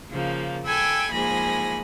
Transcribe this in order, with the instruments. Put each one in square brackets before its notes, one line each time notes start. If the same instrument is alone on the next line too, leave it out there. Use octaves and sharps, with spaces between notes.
[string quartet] C#3 F3 A#3
A4 G5 G#5 B5 E6 G#6
G#2 F3 A#3 G#5 B5 A#6